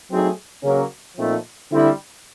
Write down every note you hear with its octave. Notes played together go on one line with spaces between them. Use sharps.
F#3 A3 C4 D#4 G#4
C#3 F#3 A#3 C#4
A#2 F3 A3 C4 D#4
D3 G3 C4 E4